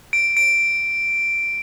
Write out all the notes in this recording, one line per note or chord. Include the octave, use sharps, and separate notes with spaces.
D7
D7